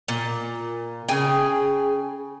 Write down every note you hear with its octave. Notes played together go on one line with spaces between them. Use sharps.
A#2
C#3 G#4 G5 G#5